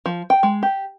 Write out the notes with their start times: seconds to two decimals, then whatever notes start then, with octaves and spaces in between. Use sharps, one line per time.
0.06 F3
0.30 G5
0.43 G#3
0.63 G4